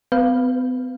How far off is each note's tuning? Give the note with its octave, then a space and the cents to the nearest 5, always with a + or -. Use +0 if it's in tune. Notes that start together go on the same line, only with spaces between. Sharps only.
B3 +45 B4 +0 F5 +0